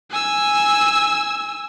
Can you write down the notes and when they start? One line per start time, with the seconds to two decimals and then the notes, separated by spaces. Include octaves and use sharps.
0.11 G#5 E6